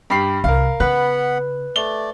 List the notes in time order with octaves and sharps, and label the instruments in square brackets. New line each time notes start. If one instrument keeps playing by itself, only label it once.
[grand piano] G2 G4 C7 [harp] B5
[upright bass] C2 [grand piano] A#4 F5
[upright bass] C#3 [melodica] B3 F#5 B5 [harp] B4 [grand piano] F#6
[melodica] A3 D5 [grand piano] G7